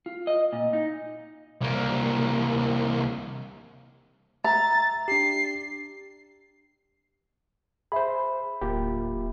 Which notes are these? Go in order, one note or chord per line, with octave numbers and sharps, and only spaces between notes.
F4
D#5
A#2
D#4
C2 A#3
E5 A#5 A6
D4 G4 C7
G#4 C5 E5 B5
D1 A#3 F4 G4